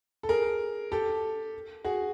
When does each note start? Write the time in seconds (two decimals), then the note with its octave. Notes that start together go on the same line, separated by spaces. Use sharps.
0.23 A4
0.29 G#4 A#4
0.92 G4 A4
1.85 F#4 G#4